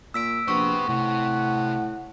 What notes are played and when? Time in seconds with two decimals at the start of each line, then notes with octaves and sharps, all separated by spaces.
0.14 A#2 E6 B6 D7
0.48 A#1 B3 G4 C5 C#6
0.89 A2 C3 F#5